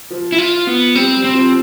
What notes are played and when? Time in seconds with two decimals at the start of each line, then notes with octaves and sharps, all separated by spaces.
0.10 F3
0.32 E4
0.38 F4
0.67 B3
0.95 G3 C4
1.14 G3
1.24 C4
1.34 F3